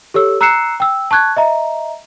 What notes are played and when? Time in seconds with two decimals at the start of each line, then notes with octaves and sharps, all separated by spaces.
0.14 G4 A4 C#5 E6
0.41 A#5 E6 F#6 C7 C#7 E7
0.80 G5 E6
1.11 A5 C#6 F#6 G#6
1.37 D#5 E5 A#5